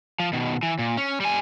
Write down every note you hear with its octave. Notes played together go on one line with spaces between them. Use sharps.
F3
B2 D#3
E3
A#2
C#4
G3 G#5